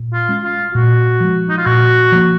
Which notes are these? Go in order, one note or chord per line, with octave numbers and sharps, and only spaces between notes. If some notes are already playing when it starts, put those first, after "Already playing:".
Already playing: A#2
F4
G#3 C#4
F4
A#2 F#4
F3 G#3
D#4
F4
A#2 F#4
F3 A#3